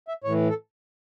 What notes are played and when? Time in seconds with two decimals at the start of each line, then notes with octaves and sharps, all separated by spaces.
0.08 E5
0.24 A2 E3 C#5
0.49 A4